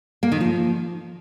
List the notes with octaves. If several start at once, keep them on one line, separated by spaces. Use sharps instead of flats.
A#3
D#3
F3